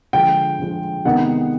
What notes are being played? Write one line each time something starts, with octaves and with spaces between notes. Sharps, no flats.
D3 F3 G#3 G5
D3 F3 G#3
C3 D#3 G#3 B3 D#4 F#5